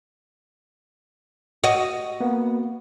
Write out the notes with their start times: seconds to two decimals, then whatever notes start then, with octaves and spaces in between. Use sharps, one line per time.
1.64 F#4 D#5
2.21 A#3 B3